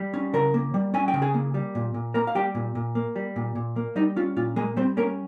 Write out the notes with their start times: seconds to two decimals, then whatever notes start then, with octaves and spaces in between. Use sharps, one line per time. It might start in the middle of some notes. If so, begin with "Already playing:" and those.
Already playing: G3
0.14 C#4
0.34 C#3 A#4 A#5
0.54 A#3
0.74 G3
0.94 C#4 G#5
1.08 G5
1.14 C#3
1.22 G#4 G#5
1.34 A#3
1.54 G3
1.75 A#2
1.94 A#2
2.14 A#3 A#4 A#5
2.27 F5
2.35 G3 G4 G5
2.55 A#2
2.75 A#2
2.95 A#3
3.16 G3
3.36 A#2
3.55 A#2
3.76 A#3
3.96 G3 D#4 D#5
4.16 C#4 F4
4.36 A#2 F4
4.56 G#3 A#3 G#4
4.76 G3 C4 C5
4.97 A#3 C#4 A#4